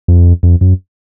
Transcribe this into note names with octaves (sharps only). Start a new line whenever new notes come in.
F2
F2
F#2